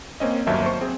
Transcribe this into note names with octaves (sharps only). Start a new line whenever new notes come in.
A#3 C4 C#4 D#5
G1 D#2 F#3 A#3 E5 A5
C5 C#6
C4 G#4